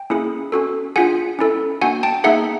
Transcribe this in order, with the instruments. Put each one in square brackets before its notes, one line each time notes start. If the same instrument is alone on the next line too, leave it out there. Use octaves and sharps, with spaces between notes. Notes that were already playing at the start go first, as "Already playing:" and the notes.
Already playing: [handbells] G5
A#3 C#4 E4 G#4
C#4 F#4 A4
D4 F4 G#4 F#5 G#5
C#4 E4 A4
A#3 D4 F#4 F#5 G#5
G5 A5
A#3 D#4 G#4 E5 F#5